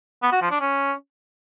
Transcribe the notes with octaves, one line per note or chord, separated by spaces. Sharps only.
B3
F#4
F3
D4
C#4